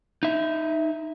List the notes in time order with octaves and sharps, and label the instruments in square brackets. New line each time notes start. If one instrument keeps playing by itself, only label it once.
[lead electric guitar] D#4 E5